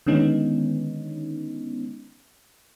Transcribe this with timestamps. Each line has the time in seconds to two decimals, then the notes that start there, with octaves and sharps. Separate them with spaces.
0.07 D3 D#3 G#3 B3 C#4 D#4